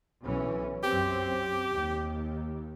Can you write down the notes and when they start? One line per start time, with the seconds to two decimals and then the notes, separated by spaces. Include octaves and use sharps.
0.22 B1 E3 C#4
0.83 F#2 C4 G4
1.71 D#2